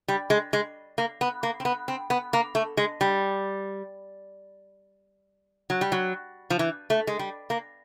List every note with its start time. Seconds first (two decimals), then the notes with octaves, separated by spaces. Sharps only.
0.08 G3
0.30 G#3
0.53 G#3
0.98 A#3
1.21 B3
1.43 A#3
1.60 C4
1.65 B3
1.88 C4
2.10 B3
2.33 A#3
2.55 A3
2.77 G#3
3.01 G3
5.70 F#3
5.81 G3
5.92 F#3
6.50 F3
6.59 E3
6.90 A3
7.07 G#3
7.19 G3
7.50 A#3